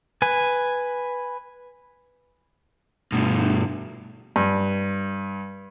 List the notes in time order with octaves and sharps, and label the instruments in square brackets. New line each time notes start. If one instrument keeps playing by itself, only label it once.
[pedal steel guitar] B4 G#5
[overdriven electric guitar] G2 B2
[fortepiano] G2